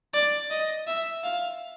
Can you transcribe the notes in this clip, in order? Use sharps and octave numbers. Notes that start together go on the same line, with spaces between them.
D5
D#5
E5
F5